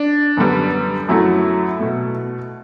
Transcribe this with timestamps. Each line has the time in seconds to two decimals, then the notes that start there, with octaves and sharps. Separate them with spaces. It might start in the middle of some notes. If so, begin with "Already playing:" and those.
Already playing: D4
0.37 F#2 D3 G3 B3
1.08 F#2 F#3 A3 E4
1.80 B2 A3